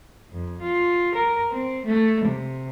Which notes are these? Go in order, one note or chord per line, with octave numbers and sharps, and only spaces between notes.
F2
F4
A#4
C4
A3
C3